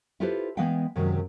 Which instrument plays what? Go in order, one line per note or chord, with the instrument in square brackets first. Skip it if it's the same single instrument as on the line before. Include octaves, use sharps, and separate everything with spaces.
[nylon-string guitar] E4 F4 G4 A4 B4 C5
E3 G#3 B3 D#5 F5 G5
F#2 C3 D#3 F#3 G#3